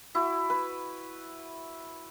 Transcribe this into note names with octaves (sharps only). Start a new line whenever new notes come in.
E4 F#4
B4